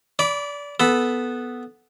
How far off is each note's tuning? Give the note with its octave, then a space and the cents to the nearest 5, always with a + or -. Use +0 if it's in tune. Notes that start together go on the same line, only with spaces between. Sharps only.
D5 -25 B5 +0 D6 +0
B3 +0 A4 -15 B5 +0